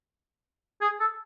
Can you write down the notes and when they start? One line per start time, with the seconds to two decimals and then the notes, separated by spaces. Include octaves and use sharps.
0.81 G#4
1.00 A4